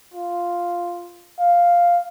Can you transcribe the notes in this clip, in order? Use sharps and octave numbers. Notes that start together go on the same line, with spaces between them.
F4
F5